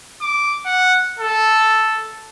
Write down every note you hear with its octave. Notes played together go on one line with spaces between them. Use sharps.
D6
F#5
A4